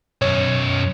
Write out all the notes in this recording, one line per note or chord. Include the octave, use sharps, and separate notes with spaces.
B1 F#2 C#5